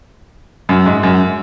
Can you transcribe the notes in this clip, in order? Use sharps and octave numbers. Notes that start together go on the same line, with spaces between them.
F#2
G#2
F#2